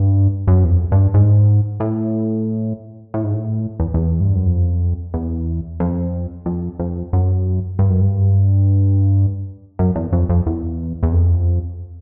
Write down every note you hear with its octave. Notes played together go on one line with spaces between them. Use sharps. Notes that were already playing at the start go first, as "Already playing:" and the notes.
Already playing: G2
F#2
E2
F2
G2
G#2
A2
A2
G#2
A2
E2
E2
G2
F#2
F2
E2
F2
F2
F2
F#2
G2
F#2
G2
F#2
E2
F2
F2
E2
E2
F2